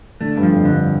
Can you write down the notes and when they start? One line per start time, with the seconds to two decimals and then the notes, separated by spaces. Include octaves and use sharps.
0.21 D3 A3
0.37 G2
0.43 F3
0.53 F2
0.65 G2 D3